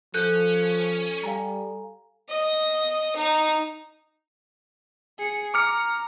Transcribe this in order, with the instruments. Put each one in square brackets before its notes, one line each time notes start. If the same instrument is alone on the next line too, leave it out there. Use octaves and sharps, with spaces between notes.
[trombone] F3 [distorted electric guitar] C#4 [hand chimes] A4 [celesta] F#6 G6
[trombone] G3 [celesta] F5 G#5 A#5
[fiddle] D#5
D#4
[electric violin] G#4 C#7
[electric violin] A#5 [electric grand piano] D6 F6 C#7